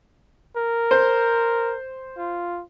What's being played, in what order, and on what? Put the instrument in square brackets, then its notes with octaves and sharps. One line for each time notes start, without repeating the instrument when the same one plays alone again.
[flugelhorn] A#4
[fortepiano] C5
[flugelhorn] F4